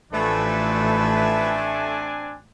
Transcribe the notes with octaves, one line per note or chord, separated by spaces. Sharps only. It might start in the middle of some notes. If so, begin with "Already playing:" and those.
A1 F3 A3 C4 D4 B4 G#5